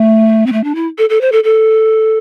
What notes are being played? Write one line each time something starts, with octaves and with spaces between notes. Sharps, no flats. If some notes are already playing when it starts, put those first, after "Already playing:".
Already playing: A3
C4
A3
D4
E4
A4
A4
C5
A4
A4